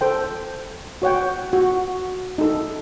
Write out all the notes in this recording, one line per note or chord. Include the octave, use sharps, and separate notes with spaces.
A4 C5 G5
F#4 C#5 F#5 G5
F#4
D#4 A4